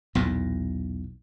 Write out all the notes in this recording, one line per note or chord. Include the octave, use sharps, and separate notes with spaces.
B1 E2 A#2